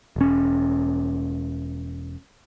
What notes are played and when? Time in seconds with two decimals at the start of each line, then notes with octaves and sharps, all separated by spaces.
0.16 E1 C#4